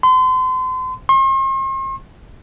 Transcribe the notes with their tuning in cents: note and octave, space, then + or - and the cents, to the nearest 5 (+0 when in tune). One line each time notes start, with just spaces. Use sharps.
C6 -35
C6 +45